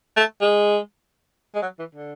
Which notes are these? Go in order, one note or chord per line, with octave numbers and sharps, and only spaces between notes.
A3
G#3
G#3
F#3
E3
D3